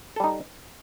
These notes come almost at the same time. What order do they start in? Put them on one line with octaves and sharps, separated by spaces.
A4 G3 D#4